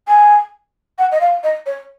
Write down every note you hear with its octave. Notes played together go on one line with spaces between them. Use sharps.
G#5
F#5
D#5
F5
D#5
C#5